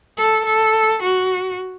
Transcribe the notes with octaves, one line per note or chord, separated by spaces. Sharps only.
A4
A4
F#4